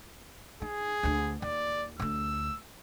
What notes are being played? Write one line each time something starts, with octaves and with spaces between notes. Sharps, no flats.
D#4 G#4
D2 D3
D#2 D5
D2 D3 E6